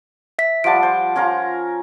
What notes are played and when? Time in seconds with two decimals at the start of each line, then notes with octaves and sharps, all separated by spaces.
0.39 E5 B6
0.64 F3 G3 F#5 A5 D7
0.83 C5
1.16 C#4 F4 A#4